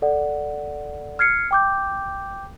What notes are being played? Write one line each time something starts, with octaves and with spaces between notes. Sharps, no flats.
A4 D5 F#5
F6 G#6 C7 C#7
G5 D6 G6